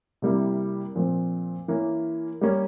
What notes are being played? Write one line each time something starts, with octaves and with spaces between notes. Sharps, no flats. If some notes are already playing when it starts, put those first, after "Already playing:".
C3 G3 A#3 E4
A#2 F3 C4 F4
E3 A#3 C#4
G3 A#3 C#4